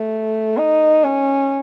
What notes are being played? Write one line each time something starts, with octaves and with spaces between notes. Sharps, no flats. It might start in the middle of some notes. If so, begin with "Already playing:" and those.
Already playing: A3
D#4
C#4